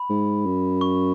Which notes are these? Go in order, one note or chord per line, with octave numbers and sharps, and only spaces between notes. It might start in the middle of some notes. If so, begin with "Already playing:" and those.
Already playing: B5
G#2
F#2
C#6